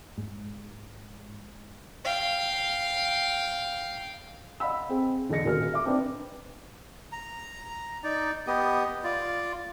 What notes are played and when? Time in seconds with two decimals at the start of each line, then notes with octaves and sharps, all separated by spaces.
0.18 G#2
2.05 F5 G5
4.60 D#5 F5 F#5 B5 E6
4.89 C4 G#4
5.29 E1 D3 G#4 D#5 A#6 C#7
5.45 D#1 F#4 G#4 A#4 B4 F6
5.74 E5 D6
5.85 C4 D4 D#4 B4
7.12 A#5
8.04 D#4 D5
8.47 B3 G4 D#5
9.04 F4 D5